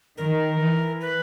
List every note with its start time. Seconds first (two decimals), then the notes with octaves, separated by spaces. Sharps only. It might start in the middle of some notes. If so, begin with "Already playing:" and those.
0.17 D#3 A#4
0.60 E3
1.01 B4